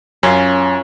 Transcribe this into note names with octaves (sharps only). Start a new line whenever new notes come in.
F#2 C#4 F4